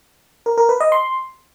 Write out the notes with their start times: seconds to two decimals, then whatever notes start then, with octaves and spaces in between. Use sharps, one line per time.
0.46 A#4
0.58 A#4
0.69 B4
0.80 D#5
0.92 C6